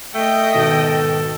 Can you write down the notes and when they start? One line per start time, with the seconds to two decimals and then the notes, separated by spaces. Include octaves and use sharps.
0.15 A3 D#5 G5
0.54 G#2 B2 D#3 A4